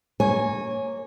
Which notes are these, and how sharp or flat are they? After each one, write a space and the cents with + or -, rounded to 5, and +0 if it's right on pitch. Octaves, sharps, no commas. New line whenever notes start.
A#3 -25 C#5 -15 G#5 +5